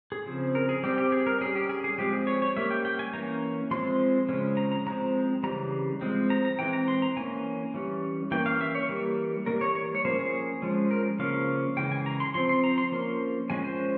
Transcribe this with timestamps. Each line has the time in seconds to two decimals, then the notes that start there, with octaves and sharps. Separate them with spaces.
0.12 G#4
0.26 C#3 F3 C4
0.55 A#4
0.69 G#4
0.83 G3 C4 G4
0.98 G4
1.12 G#4
1.27 A#4
1.41 G3 C#4 G#4
1.55 G4
1.69 G#4
1.84 G#4
1.98 F3 G#3 C4 G4
2.13 G#4
2.27 C#5
2.42 C#5
2.56 G3 A#3 C#4 E5
2.71 G5
2.85 G5
2.99 G#5
3.13 E3 A#3 C#4 A#5
3.71 F3 G#3 C4 C6
4.29 C#3 F3 G#3 C#4
4.57 A#5
4.72 A#5
4.86 F3 G#3 C4 A#5
5.43 C#3 E3 G3 A#5
6.01 F3 G#3 C4
6.30 A#5
6.45 A#5
6.59 E3 G#3 C4 G5
6.73 A#5
6.88 C6
7.02 A#5
7.17 E3 A#3 C#4 G#5
7.74 E3 G3 C#4
8.31 E3 A#3 C#4 G5
8.46 F5
8.61 E5
8.75 C#5
8.89 E3 G3 A#3
9.46 E3 G3 A#3 C#4 A#4
9.61 C#5
9.75 C#5
9.95 C#5
10.05 F3 A#3 C#4 C5
10.19 G#4
10.62 F3 G#3 C#4
10.91 A#4
11.19 C#3 F3 A#3 C#4 F5
11.77 C#3 E3 G#3 G5
11.91 G#5
12.06 A#5
12.20 C6
12.34 F3 C4 C6
12.49 C6
12.64 A#5
12.78 C6
12.92 F3 A#3 C#4
13.50 F3 G#3 C#4 G#5
13.64 C5